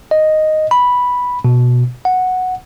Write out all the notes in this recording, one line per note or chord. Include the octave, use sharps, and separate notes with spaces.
D#5
B5
B2
F#5